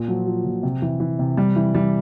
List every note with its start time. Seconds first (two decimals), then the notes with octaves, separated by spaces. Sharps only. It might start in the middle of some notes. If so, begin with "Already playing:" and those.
Already playing: A#2
0.08 F3 F#3
0.27 F3
0.45 A#2
0.63 C3
0.82 E3
1.00 E3
1.19 C3
1.37 C3 G3
1.56 E3
1.74 E3 G3